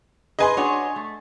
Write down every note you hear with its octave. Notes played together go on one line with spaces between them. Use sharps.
G#4 B4 D#5 G#5 C6
D4 F#4 C#5
A3